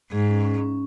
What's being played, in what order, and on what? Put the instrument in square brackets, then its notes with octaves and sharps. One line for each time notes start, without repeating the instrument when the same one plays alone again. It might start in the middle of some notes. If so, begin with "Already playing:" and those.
[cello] G#2 [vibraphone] G#4
[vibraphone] C#4
C#4
C#4